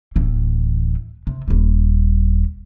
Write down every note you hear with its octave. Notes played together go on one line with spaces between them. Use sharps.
D1 E3
C3
D#1 G3